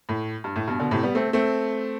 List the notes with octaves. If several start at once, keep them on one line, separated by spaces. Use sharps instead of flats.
A2
G2
A2
G2 B2
B2 D3
A2 C3
G3 B3
A3 C4
A3 C4